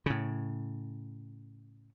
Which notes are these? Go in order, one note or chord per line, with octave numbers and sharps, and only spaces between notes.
A2 C#3